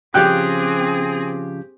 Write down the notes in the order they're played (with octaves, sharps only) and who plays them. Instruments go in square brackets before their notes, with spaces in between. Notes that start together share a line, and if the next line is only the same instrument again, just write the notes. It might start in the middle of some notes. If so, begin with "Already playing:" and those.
[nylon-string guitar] C#3 F3 C#4 [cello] C4 G#4 [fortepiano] G4 G5 F#6